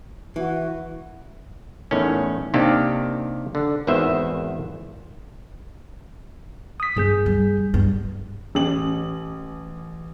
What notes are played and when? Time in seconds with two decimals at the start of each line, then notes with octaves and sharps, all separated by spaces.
0.36 E3 F#4
1.91 E2 A2 D#3 C#4
2.54 C3 D#3 A#3 D4 G4
3.55 D3
3.87 G#1 E2 D#3 B4 C5 E5
6.80 D#6 B6
6.97 G2 D#3 G#4 G6
7.26 G3
7.74 G2
8.55 A1 F#7